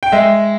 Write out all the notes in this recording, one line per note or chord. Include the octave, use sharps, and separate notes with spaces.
G5
G#3 E5